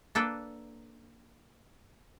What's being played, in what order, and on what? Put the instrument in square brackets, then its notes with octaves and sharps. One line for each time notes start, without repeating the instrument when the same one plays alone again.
[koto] A#3 D4 A4 B4 G5